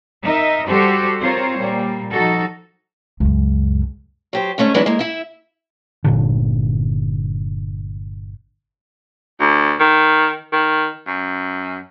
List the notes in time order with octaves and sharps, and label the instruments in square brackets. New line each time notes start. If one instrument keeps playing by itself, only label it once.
[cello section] D#4 A#4 D#5 E5
G3 F#4 G4 A4 C5
C4 F4 A#4 C5 C#5
A#2 G3 A#3
F3 D#4 F#4 A4
[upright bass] C#2 F#2
[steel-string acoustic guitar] F#3 G4 C5
G#2 D3 A3 C#4
E3 F#3 G#3 B3 D4 E4
G#3 A#3
E4 E5
[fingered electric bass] G1 A#2 D3
[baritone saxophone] D2
D#3
D#3
F#2